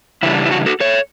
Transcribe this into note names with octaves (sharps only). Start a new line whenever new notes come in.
C#3 E3 G3 D4 E4
E4
F#4
F#4 A4
A4 C#5